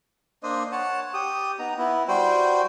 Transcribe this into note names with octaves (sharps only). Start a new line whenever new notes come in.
A#3 D4 C5 D#5
C#5 F#5 A5
G4 D#6
B3 D#4 A#5
B3 E4
G3 F#4 C5 G5